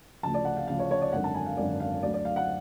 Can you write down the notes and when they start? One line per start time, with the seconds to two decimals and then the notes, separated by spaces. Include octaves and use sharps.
0.23 D2 C#3 F3 A5
0.34 D5
0.45 F#5
0.57 F5
0.67 D2 C#3 F3 F5
0.79 C#5
0.91 C#5
1.02 D5
1.13 G#1 F#2 D3 F#5
1.24 A5
1.35 G#5
1.46 F5
1.57 G#1 F#2 D3 D5
1.80 F5
2.03 D2 D3 F#3 D5
2.14 D5
2.25 F5
2.36 F#5